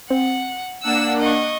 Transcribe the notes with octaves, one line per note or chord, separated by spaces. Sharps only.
C4 F#5
A#3 D4 F#5 E6 E7
D#5 C#6